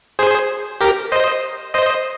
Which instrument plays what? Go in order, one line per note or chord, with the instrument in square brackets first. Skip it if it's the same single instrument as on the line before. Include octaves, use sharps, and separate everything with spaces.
[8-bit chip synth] G#4 C5
G4 A#4
C5 D#5
C5 D#5